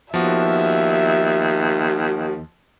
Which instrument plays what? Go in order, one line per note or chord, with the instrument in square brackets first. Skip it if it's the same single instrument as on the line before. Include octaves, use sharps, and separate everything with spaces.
[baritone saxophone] D#2 [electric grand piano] F3 B3 F#4 [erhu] E5